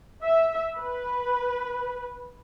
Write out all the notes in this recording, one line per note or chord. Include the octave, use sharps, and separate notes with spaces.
E5
B4